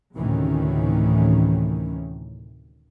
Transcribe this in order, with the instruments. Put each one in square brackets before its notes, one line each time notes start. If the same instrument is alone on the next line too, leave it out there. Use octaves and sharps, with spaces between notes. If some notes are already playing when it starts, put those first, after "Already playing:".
[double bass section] D2 A2 C3 D#3 E3 C#4